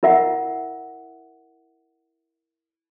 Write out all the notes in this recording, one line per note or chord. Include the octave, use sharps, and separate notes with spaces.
E4 A#4 E5 F#5